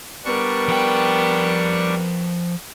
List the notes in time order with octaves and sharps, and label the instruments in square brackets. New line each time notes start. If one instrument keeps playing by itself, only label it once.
[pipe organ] G3 D4 C#6 [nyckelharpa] B3 A#4
[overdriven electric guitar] F3 G5